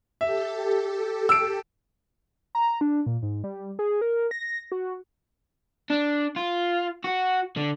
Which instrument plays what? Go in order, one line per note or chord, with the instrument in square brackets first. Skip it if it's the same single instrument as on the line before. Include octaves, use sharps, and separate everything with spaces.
[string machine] G4 A4 [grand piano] E5
[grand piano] E6 D7
[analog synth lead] A#5
D4
A#2
G#2
G3
G#4
A#4
A#6
F#4
[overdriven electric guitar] D4
F4
F#4
D3